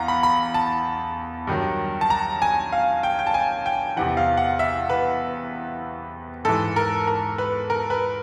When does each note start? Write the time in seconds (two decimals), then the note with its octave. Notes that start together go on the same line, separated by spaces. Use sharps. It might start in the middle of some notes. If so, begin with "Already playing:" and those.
Already playing: E2 F5 F#5 A#5
0.08 B5
0.23 B5
0.54 A5
1.47 G2 D#3 F#3
2.01 A5
2.10 A#5
2.42 G#5
2.72 F5
3.03 G5
3.19 G5
3.27 A5
3.34 G#5
3.66 G5
3.97 E2 C3 E3 F#5
4.17 F5
4.37 F#5
4.59 E5
4.90 B4
6.45 G#2 E3 A4
6.76 A#4
7.07 A#4
7.38 B4
7.70 A#4
7.90 B4